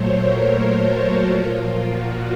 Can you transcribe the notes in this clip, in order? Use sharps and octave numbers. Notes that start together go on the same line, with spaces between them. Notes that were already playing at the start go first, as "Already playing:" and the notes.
Already playing: A#2 F#3 A3 C5 C#5
A#4
A4
F#4
A#2 F3 A#3 F4
F#4